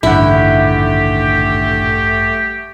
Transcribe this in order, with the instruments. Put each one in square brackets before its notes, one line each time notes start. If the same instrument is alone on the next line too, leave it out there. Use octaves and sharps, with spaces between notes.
[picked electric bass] D#1 D3 [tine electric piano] A1 G2 F#5 [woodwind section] A3 G4 [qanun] E4